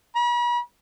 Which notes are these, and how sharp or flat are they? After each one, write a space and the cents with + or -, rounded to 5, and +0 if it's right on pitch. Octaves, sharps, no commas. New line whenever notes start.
B5 -45